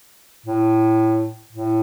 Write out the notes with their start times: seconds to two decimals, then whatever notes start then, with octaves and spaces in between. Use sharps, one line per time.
0.46 A2
1.53 A2